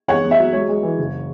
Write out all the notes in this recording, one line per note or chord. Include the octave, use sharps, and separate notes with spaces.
E2 C#5 F#5
E2
E5
F#3
G#3 C#5
G#3
E3
F#1